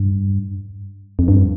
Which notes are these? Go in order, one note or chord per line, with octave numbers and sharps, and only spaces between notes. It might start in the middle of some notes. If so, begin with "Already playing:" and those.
Already playing: G2
F2
G2